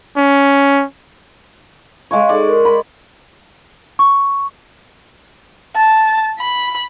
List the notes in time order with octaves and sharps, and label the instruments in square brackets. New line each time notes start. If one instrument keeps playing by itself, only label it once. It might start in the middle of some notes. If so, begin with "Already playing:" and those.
[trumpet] C#4
[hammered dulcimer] G#3 C#5 [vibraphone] F5 G#5 C#6
[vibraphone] D#4 G#4 A4 [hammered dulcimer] D5
[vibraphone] A#4
[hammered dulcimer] B5
[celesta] C#6
[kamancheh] A5
B5